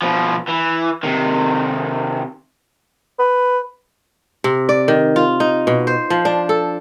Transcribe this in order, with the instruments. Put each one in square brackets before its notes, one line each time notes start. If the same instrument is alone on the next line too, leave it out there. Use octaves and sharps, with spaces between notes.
[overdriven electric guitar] B2 F3
E3
C3 D#3
[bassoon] B4
[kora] C3
D5
D#3
F4
D#4
B2
C5
F3
D4
A4